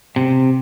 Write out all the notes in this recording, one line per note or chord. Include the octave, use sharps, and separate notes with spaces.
C3